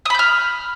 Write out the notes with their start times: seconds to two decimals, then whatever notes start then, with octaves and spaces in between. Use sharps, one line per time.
0.05 D#6
0.10 B5
0.15 G6
0.19 F6